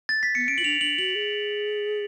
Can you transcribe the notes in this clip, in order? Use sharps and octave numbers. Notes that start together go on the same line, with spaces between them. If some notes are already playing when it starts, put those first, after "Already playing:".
A6
B6
B3 C#7
C#4 D7
F4 F#7
D4 F7
D4 F#7
F#4 F#7
G#4